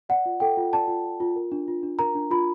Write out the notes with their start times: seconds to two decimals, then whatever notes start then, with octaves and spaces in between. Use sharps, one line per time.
0.09 D5 F#5
0.26 F4
0.40 A4 G5
0.57 F4
0.73 D5 A5
0.88 F4
1.05 A4
1.20 F4
1.36 A#4
1.52 D4
1.68 F4
1.83 D4
1.99 A#4 A#5
2.15 D4
2.31 F4 B5